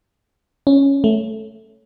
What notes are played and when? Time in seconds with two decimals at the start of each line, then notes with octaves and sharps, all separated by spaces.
0.67 C#4
1.04 A3